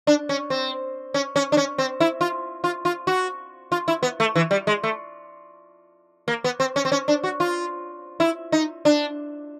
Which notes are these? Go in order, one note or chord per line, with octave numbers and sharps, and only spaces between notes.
D4
C#4
C4
C#4
C#4
D4
C#4
C4
E4
F4
F4
F4
F#4
F4
E4
B3
A3
E3
G3
G#3
A3
A#3
B3
C4
C#4
C4
C#4
D4
F#4
F4
E4
D#4
D4